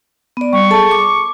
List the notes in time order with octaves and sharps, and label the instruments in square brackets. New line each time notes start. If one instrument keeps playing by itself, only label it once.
[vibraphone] B3 D5
[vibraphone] G3 [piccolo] C#6
[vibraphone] G#4 A4 A5
D6